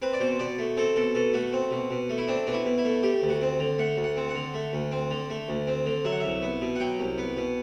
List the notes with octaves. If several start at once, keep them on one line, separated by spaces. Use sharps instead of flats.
C4 B4
D5
B2 C5
B2 D5
A3
C4 A4
B2 A4
B2 A4
A3 F#4
C4
B2
B2
A3
E4
C4 D4
B2 D4
E4
B2
E4
A3
A3 G4
D2
F#4
C4
D3
A3 F#5
D2
F#5
C4
F#5
D3
A3
D2
C4
D3
A3
D2
C4
D3
F#3 E5
F#5
C2 E5
B3
B2
F#5
F#3 G5
C2
B3
B2